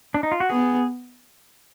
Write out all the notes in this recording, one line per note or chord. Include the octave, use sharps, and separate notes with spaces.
D4
D#4
F4
F#4
B3 G#4